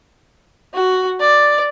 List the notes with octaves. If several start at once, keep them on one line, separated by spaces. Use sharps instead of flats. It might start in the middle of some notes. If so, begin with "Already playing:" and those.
F#4
D5